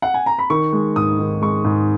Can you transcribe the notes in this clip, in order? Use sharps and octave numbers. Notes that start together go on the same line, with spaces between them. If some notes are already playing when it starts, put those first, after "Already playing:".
F#5
G#5
A#5
B5
D#3 C#6
G#3
G#2 D#6
D#3
G#3 C#6
G#2